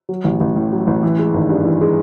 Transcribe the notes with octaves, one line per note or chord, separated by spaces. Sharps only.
F#3
A1
A1
A2
F#3
A1
E3
G#3
G#1
G2
E3
G#3